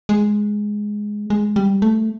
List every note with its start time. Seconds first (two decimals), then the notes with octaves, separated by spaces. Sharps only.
0.09 G#3
1.30 G#3
1.56 G3
1.82 A3